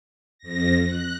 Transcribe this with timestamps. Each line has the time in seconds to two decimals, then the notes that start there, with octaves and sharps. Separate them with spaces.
0.39 F2 A#6
0.86 F#6